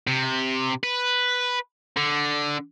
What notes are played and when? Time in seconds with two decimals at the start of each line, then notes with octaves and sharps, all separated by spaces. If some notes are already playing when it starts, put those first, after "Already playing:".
0.07 C3
0.83 B4
1.97 D3